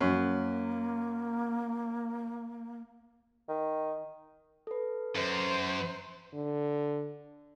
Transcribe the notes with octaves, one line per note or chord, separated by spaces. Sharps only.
F#2 A#3
D#3
A4 B4
F#2 C5
D3